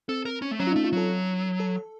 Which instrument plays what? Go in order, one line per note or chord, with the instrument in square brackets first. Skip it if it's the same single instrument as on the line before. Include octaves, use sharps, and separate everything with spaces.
[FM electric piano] C4 [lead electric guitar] A4
[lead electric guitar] A#4
C#4
A3
[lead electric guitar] F#3 [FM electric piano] C#4
[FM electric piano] F4
[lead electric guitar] A3 [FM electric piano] D#4
[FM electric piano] F4
[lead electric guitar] F#3 [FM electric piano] A4
[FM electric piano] A4